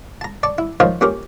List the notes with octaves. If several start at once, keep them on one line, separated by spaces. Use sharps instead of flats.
A5 A#5
D5 A5 C#6
E4
F3 D#4 F4 A#4 C5 C#5
A#2 C#4 G4 A#4